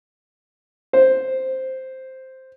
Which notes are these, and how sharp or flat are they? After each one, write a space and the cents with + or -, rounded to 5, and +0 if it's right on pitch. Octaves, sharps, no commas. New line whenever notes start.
C5 +0